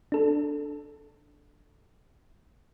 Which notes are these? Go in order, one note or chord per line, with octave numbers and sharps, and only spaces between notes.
D4 A4